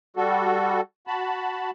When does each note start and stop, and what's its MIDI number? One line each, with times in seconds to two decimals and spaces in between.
0.17 0.81 55
0.17 0.81 66
0.17 0.81 69
1.07 1.71 66
1.07 1.71 81
1.07 1.71 83